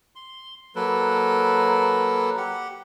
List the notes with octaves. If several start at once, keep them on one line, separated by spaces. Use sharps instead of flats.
C6
F#3 A#3 A4 B4
G4 F#5